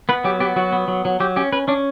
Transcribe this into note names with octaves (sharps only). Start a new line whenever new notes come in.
B3 B4
F#3 G4
B3 G4
F#3 F#4
B3
F#3
F#3
F#3 G4
C#4 G4
C#4 B4
C#4 D4